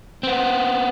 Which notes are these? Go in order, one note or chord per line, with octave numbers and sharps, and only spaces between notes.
B3 C4